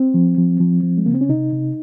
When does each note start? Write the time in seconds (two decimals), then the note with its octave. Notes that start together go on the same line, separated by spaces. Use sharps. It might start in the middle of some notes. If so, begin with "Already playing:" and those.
Already playing: C4
0.14 F3
0.37 F3
0.60 F3
0.83 F3
0.98 G#3
1.06 C#3 A#3
1.14 C4
1.21 C#4
1.29 C3 D#4
1.53 C3